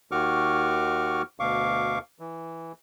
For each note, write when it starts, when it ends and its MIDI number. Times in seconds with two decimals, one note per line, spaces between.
0.12 1.22 39
0.12 1.22 51
0.12 1.22 66
0.12 1.22 85
0.12 1.22 86
0.12 1.22 89
1.40 1.99 38
1.40 1.99 47
1.40 1.99 77
1.40 1.99 85
1.40 1.99 86
2.19 2.72 52